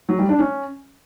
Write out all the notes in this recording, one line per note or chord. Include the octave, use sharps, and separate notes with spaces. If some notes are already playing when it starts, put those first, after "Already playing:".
F#3
G3
D4
C#4